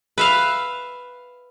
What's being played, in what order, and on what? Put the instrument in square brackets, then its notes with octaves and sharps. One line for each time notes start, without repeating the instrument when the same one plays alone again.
[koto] B4 E5 F5